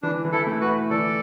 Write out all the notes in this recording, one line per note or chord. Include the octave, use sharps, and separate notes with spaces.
E3 D4
E3
E4 A4
A3
F#4 B4
E4
E3 A4 D5